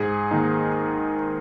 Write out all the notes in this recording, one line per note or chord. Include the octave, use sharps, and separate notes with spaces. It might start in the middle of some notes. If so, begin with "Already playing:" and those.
Already playing: G#2 G#4
D#3 A#3 D#4